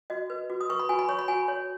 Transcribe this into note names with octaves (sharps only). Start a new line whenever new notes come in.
F#4 D#5
B4
F#4
D#6
B4 C#6
B5
F#4 G#5
B5
C#5 C#6
B5
F#4 G#5
C#5